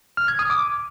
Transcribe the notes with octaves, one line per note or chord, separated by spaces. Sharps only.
F6
G#6
D#6
D6